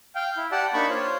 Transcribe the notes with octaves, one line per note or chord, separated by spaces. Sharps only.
F5 G5
E4
G4 D5 F#5 A5
A#3 D4 D#4 A5 B5 C#6
F4 C5 C#5